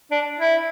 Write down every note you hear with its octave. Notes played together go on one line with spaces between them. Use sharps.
D4
E4